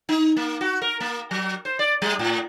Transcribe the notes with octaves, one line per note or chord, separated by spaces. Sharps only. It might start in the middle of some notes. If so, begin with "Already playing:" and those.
D#4
A#3
F#4
A#4
A#3
F#3
C5
D5
G3
A2